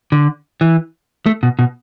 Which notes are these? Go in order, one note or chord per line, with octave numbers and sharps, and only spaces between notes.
D3
E3
A3
B2
B2